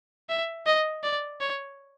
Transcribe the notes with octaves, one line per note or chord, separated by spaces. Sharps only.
E5
D#5
D5
C#5